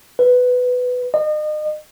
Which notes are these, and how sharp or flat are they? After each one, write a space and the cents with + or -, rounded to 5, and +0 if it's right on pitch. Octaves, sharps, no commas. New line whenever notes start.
B4 +10
D#5 -35